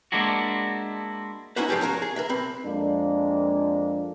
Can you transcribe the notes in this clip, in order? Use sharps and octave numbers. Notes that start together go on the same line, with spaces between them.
G#3 A#3 D4 E4 F#4
C#4 D#4 E4 F#4 B4 C5
G#2 F3 A3 G4 G#4
C#4 F#4 A#4 F5
G#4
A#4 B4 E5
B1 C4 B5
F2 G#3 A#3 D4